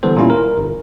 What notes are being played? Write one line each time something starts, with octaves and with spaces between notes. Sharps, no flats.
D3 E3 G3 B3 A4 C5
A#2 G3 C#4 E4 F4
A#4
G1